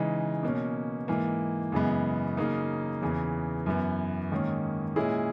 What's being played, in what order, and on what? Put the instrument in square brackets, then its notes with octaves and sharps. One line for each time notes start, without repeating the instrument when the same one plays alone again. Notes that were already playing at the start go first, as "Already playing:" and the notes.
Already playing: [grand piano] C#3 E3 G#3 D#4
B2 A#3 C#4
G#2 E3 A#3
F#2 C#3 E3 G#3 B3
C#3 F#3 A#3 D#4
E2 C#3 E3
F#2 E3 B3
G#2 D#3 A#3 C#4
A#2 G#3 C#4 E4 G#4